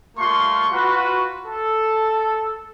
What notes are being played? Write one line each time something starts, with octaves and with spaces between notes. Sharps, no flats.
G3 A3 A#3 F4 C6 C#6
F4 F#4 B4
A4